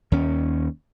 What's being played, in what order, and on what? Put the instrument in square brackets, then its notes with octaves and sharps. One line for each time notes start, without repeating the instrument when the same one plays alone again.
[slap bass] D#2 C#4